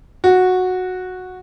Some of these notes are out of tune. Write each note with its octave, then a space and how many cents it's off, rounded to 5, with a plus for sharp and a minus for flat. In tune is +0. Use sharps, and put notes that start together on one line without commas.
F#4 -10